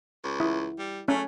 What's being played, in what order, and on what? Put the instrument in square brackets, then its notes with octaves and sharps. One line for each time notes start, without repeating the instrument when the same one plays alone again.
[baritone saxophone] C#2
[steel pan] E4
[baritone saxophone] G3
[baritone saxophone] A3 [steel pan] C#4